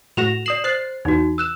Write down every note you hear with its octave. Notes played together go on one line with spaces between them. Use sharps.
A2 F#4 A#6 E7 F7
D5 D#6 C7 E7 F#7
C5 F#6 A6 C7
E2 D#4 F#4
E6 F#6 E7